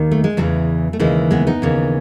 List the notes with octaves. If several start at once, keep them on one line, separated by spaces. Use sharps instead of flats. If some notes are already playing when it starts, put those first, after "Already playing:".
Already playing: D#2 D#3
A3
G#3
E2 C#3 E3 F#3
A3
D#2 C#3 E3 G#3
G#3 B3
B3 D#4
D#2 C#3 E3